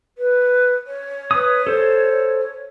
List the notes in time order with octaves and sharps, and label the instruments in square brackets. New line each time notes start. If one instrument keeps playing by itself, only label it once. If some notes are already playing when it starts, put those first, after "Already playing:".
[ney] B4
C#5
[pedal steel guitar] B4 D#6
A4 C5